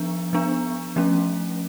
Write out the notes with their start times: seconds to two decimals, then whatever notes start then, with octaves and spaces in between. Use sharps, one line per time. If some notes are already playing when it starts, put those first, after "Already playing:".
Already playing: F3 B3 D4
0.33 F3 B3 D4
0.96 F3 A3 C#4